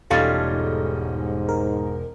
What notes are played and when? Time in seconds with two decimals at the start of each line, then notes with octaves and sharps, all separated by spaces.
0.10 E1 G3 C#4 D#4 F4 A4 D#5
0.50 G#2
1.49 A#4